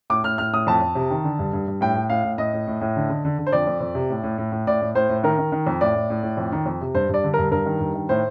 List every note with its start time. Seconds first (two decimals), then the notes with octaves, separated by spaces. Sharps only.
0.10 A2 D6
0.24 A2 F6
0.38 A2 F6
0.53 A2 D#6
0.67 F2 A5
0.82 F2
0.95 C3
1.11 D#3
1.24 D3
1.39 G2
1.53 G2
1.68 G2
1.81 A2 G5
1.95 A2
2.10 A2 F5
2.24 A2
2.38 A2 D#5
2.53 A2
2.67 A2
2.81 A2
2.96 D3
3.09 D3
3.25 D3
3.39 D3
3.47 C5
3.53 F2 D5
3.67 F2
3.81 F2
3.95 C3
4.10 A2
4.24 A2
4.38 A2
4.52 A2
4.67 A2 D5
4.82 A2
4.95 A2 C5
5.09 A2
5.23 D#3 A#4
5.38 D#3
5.52 D#3
5.67 F2
5.81 A2 D5
5.96 A2
6.10 A2
6.23 A2
6.37 F2
6.52 D#3
6.66 F2
6.81 C3
6.95 G2 C5
7.09 G2 D5
7.24 D3
7.34 G2 A#4
7.51 G2 A#4
7.66 D#3
7.80 G2
7.94 D#3
8.09 A2 C5